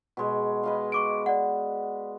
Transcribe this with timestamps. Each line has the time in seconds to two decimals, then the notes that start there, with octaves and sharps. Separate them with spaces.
0.17 B2 G#3
0.63 B4 D#5 F5
0.92 C#6 D6 D7
1.26 D5 F#5